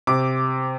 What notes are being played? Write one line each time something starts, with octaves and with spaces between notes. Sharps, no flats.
C3 D6